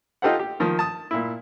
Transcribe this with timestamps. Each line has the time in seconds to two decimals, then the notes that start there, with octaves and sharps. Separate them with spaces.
0.22 D#4 F4 G4 A4 C5 F#5
0.39 G4
0.60 D#3 F3
0.79 A5 D#6
1.11 A#2 E4